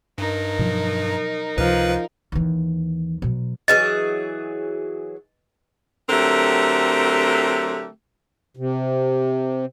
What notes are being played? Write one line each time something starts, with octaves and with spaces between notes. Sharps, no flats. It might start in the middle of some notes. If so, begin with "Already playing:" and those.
G2 D#4 A#4
B2 F3 F#3
C#2 C3 F3 B4
D#2 E3
B2 F#3
E3 F#3 G#4 B4 D#5 A6
D3 F#3 A3 C4 G4 A#4
C3